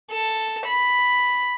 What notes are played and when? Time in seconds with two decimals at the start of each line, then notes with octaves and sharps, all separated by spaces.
0.11 A4
0.66 B5